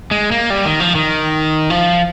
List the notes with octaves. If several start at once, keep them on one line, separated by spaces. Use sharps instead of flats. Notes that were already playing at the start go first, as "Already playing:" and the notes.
G#3
A#3
G3
D#3
F3
D#3
F3